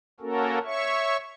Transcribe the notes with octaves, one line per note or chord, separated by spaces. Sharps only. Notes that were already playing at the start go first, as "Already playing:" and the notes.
A#3 C#4 F#4 A4 A#4
C#5 E5 C#6